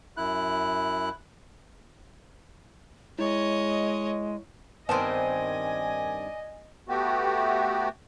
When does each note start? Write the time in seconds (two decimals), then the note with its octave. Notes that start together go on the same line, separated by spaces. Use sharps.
0.17 F#2 E4 F#6
3.19 G#3 E4 C#5 D#5
4.89 G2 D#3 B3 C4 D5 D#5 G#5 A5
6.89 A3 B3 F#4 G4